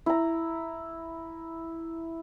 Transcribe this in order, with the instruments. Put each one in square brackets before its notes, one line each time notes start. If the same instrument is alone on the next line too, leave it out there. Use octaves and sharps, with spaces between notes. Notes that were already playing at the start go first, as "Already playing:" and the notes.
[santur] E4 A#5